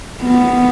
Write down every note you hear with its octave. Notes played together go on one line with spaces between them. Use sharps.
B3